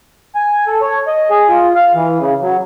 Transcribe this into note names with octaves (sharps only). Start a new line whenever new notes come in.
G#5
A4
C#5
D#5
G#4
F4
F5
E3
C#3
F#3